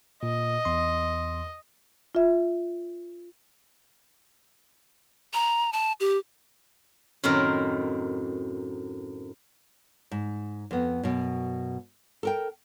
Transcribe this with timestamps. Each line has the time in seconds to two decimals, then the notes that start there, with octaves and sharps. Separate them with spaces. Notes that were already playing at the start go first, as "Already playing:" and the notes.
0.23 A#2 D#5
0.65 E2 C6
2.15 F4 E5
5.34 A#5
5.73 A5
6.00 G4
7.24 F#2 A2 D#3 C4 A#4
10.11 G#2
10.71 F2 B3
11.03 F#2 B2
12.23 A4 A#4 G5